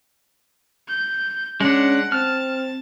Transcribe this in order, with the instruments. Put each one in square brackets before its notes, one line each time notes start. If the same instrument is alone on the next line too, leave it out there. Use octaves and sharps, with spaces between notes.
[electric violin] G6
[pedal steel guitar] G#3 D4 [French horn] C#4 [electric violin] F#5
[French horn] C4 [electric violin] A5 [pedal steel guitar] F6